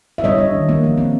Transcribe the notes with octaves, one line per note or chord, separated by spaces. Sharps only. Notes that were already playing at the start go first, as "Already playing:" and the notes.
E5
G3 C#5 D#5
D4
D#3
A#3
F3
C4